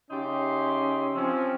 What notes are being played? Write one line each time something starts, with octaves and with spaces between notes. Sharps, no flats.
C#3 C#4 D#4 G4 E5 C6
F3 C4 C#4